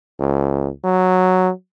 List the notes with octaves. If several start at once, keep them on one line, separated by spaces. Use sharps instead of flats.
C#2
F#3